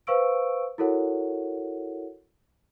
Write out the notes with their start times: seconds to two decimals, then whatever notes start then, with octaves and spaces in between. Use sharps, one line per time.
0.07 B4 C5 F5 C#6 E6 D7
0.78 E4 F#4 A4 A#4 C#5 F#5